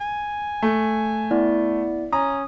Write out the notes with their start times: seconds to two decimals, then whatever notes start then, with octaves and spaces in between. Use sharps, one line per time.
0.01 G#5
0.62 A3
1.31 B3 E4 D5
2.13 C#4 A#5 D#6